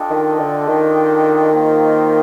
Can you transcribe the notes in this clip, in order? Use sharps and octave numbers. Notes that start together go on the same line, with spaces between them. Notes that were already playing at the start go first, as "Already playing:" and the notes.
Already playing: D4 F4 A4 D#5 G5
D#3
D3
D#3
A#3 F4 C5 D#5 G5